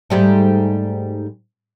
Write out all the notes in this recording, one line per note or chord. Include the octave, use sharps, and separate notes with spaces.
G#2 G3 A3